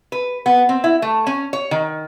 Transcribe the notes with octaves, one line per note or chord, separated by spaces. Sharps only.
B4
B3
C4
E4
A3
C#4
C#5
D#3